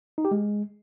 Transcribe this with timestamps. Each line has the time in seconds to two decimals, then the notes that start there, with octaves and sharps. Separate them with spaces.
0.18 D#4
0.25 G4
0.31 G#3